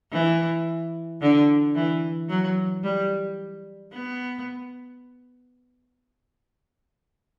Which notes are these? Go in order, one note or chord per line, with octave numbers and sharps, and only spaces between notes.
E3
D3
E3
F#3
G3
B3